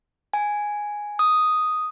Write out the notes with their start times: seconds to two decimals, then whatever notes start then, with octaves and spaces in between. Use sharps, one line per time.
0.34 G#5
1.19 D#6